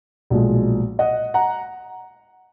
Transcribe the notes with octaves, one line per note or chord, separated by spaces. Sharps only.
B1 A#2 F3 G#3
D#5 F#5
F#5 A#5